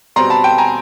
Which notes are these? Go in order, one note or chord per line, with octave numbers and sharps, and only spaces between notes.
B2 G3 C4 A#5 C6
A5 B5
G5 A5
G#5 A#5